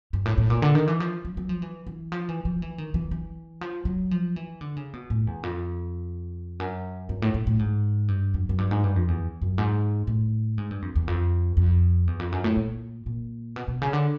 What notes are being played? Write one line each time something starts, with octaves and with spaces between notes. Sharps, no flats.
G2
A2
A2
A#2
D3
D#3
E3
F3
F#3
F#3
F3
E3
E3
F3
E3
F3
E3
D#3
E3
E3
F3
F#3
F3
E3
D3
C#3
B2
A2
E2
F2
F#2
G2
A2
A2
A2
G#2
G2
F#2
F#2
G2
G#2
G2
F2
E2
F#2
G#2
A2
G#2
G2
F2
E2
F2
F2
E2
F2
F#2
A2
A#2
A#2
B2
B2
C#3
D3